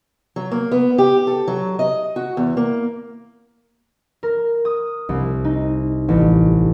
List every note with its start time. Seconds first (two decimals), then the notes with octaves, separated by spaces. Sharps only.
0.36 F#3
0.52 A#3
0.72 B3
0.98 G4
1.27 A4
1.48 F#3
1.79 D#5
2.16 F#4
2.37 E2
2.57 A#3
4.23 A#4
4.65 D#6
5.09 C2
5.45 D#4
6.08 A1